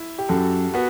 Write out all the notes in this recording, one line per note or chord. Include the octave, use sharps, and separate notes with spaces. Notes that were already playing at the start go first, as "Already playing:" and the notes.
Already playing: E4
G4
F#2 F#4 A4
B3 F#4